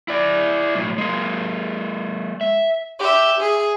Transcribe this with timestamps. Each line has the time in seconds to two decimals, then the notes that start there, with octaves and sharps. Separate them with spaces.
0.08 E4 D5
0.75 B1 A2
0.98 G#3 A#3
2.41 E5
3.00 G4 E5
3.40 G#4